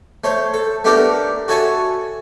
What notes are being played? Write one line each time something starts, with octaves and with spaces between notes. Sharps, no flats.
A3 C5 C#5
A4
A3 B3 D4 G4 A4 A#4
F#4 A4 C#5 E5 G#5 A5